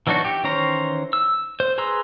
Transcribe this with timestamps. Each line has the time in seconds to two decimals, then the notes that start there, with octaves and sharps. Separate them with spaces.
0.07 E3 F#3 D4 D#4 F#4
0.25 G4
0.43 D#3 E3 C#4 C5 A#5
1.13 E6
1.60 C5
1.78 G#4 B4 A#5 C6 E6